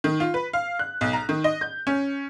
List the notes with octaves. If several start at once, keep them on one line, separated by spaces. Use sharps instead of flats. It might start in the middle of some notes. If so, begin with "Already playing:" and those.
D#3
F4
B4
F5
F#6
B1
A#5
D#3
D#5
G6
C#4